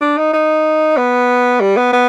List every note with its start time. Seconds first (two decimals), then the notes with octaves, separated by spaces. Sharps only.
0.01 D4
0.18 D#4
0.34 D#4
0.97 B3
1.61 G3
1.77 B3
1.93 B3